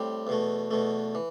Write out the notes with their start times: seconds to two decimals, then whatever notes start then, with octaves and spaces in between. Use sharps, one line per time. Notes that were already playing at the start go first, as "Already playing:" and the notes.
Already playing: A2 G3 C4
0.27 E2 B2 A3
0.71 E2 B2 A3
1.15 E3